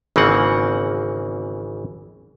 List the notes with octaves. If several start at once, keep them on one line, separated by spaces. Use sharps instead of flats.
G#1 C#3 E3 A#3 C4 F#5